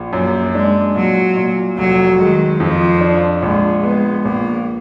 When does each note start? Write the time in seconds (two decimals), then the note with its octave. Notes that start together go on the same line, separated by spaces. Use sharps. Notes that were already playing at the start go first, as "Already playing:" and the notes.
Already playing: A#1
0.13 F#2 A#3
0.54 G#3 D4
0.95 A#2 F#3
1.37 A#2
1.78 F1 F#3
2.19 D#3 G#3
2.60 F2 F3
3.01 D4
3.42 A#1 G#3
3.83 G#3 B3
4.24 A#1 A#3